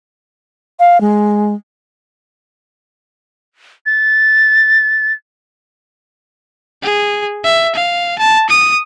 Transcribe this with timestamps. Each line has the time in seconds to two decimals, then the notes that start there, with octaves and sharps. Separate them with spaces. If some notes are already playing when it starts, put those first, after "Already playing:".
0.80 F5
1.01 G#3
3.86 A6
6.83 G#4
7.44 E5
7.75 F5
8.19 A5
8.49 D#6